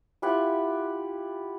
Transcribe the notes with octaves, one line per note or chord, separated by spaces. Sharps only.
E4 F4 G4 F#5